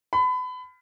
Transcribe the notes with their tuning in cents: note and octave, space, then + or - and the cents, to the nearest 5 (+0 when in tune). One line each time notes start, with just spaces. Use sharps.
B5 +30